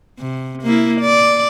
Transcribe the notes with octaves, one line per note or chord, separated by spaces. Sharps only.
C3
A#3 E4
D5